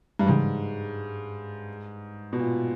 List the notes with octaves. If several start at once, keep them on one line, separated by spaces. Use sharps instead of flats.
G2
G#2 C#3 E3 G3
B2
A#2